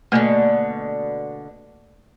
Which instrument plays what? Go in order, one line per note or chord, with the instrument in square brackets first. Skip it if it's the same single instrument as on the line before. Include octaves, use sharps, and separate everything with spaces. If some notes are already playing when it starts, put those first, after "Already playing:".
[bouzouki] B2 D3 [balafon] A3 A#3 G#5